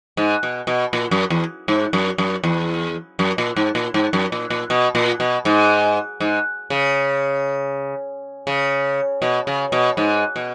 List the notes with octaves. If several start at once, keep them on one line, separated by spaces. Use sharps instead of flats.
G#2
B2
B2
A#2
F#2
E2
G#2
F#2
F#2
E2
F#2
A#2
G#2
A#2
G#2
F#2
A#2
A#2
B2
A#2
B2
G#2
G#2
C#3
C#3
B2
C#3
B2
G#2
B2